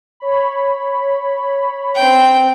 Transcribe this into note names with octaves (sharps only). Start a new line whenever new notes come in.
C#5 B5
C4 G5